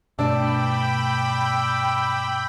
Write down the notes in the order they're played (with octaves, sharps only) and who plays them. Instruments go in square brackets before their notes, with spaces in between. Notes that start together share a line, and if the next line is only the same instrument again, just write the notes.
[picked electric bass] G2 B2 A3 [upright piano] D4 [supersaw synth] G5 B5 [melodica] D6 E6